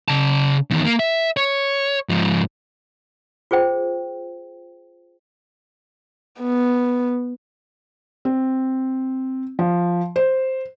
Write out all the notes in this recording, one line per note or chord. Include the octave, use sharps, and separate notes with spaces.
C#3 A5
E2 D#3
A#3
E5
C#5
G#2 F3
F4 G#4 C5 G5
B3
C4
F3
C5